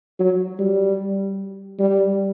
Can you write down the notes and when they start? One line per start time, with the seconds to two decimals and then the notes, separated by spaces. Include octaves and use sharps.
0.20 F#3
0.59 G3
1.79 G3